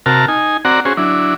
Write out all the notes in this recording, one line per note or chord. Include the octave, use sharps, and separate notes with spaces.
C3 F#4 A#4 A5 F6
D#4 G#5
C4 F#4 D5 F#5 A#5
C#4 F#4 G#4 C5
F#3 D4 E4